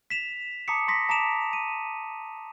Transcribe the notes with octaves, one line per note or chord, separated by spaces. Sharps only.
B6 E7 F7
A5 A#5 D6 D#6 B6 C#7
C6 A#6 B6
A5 A#5 D6 D7 E7 F7
D#7